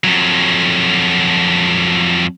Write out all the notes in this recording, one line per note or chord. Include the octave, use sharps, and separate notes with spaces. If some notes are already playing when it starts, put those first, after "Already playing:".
F2 F#3